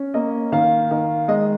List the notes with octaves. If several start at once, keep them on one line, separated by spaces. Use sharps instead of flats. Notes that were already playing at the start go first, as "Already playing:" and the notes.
Already playing: C#4
A#3 D#5
D#3 F5
D#3
G#3 D#5